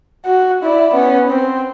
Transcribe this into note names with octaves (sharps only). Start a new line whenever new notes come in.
F#4
E4 D5
B3 C#4
C4